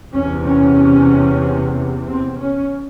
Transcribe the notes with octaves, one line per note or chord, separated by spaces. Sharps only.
E2 C3 C#4
C#4
C4
C#4